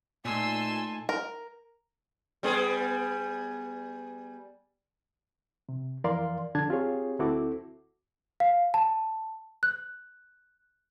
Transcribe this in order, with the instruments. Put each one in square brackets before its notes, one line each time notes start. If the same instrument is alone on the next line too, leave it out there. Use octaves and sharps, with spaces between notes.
[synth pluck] A#2 [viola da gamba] A3 D#4 [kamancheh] G#5 A5 [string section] C6 E6
[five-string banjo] A#4
[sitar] G3 B3 G#4
[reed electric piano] C3
F2 E3 A#4 D5 F5 C6
F2 D3 D4 A5 G#6
C4 F4 G4 G#4 C#5
D2 C4 E4 F#4 A4 D6
[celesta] F5
A5
F#6